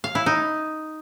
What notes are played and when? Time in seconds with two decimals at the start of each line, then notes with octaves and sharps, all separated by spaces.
0.04 F5
0.15 E4
0.26 D#4